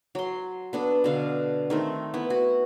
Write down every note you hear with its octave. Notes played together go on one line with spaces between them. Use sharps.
F#3 C6
B3 D4 A4
B2 D3 F5
D#3 A3 C4
B3 E4
F#4